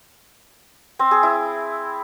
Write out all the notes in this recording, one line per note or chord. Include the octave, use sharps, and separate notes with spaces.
C4
G#4
E4